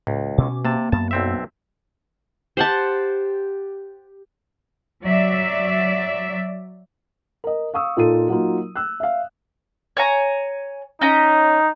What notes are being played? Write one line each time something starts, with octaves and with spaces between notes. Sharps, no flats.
C#2 A2
B2 C#4 D6
C3 A#3 A5
F#2 B3 A5
B1 C4 E5
G4 C5 F#5 A5
F#3 D5 E5
A#4 D#5
F5 C#6 D#6 E6
A#2 D#4 F4 A4 D#7
F#3 A#3 D#4 F4
E6 F#6
E5 F5
C#5 G#5 A#5
C#4 D#4 D#5 A#5